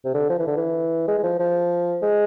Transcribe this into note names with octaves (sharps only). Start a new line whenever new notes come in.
C3
D3
F3
E3
D3
E3
G#3
G#3
F3
F3
G#3